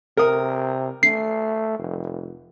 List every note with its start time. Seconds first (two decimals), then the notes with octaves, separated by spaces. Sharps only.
0.17 C3 A#4 D#6
1.03 A3 C7
1.79 F1